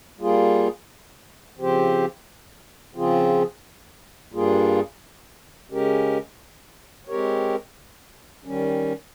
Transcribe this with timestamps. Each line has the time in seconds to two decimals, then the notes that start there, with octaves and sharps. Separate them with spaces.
0.19 G3 A#3 F4 G#4
1.57 C#3 F3 C4 G4 C5
2.95 C#3 F3 C4 F4 G#4
4.33 G2 G3 A#3 F4 G#4
5.70 C#3 G#3 C#4 G4 A#4
7.07 G#3 C4 G4 A#4 C#5
8.45 D#3 G3 C#4